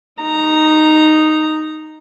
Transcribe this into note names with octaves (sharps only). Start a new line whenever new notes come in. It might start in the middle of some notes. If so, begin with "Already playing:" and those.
D#4 A#5